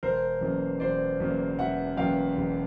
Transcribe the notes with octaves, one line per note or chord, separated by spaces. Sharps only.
E1 A#4 C5
E2 C#3 F#3 A#3
E1 C5 D5
E2 C#3 F#3 A#3
E1 E5 F#5
E2 C#3 F#3 A#3 F5 G5
E1